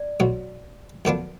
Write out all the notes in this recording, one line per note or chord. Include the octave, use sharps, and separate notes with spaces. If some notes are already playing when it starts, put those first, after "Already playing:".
Already playing: D5
B1 B2 F#3
F#2 D3 F3 B3 D4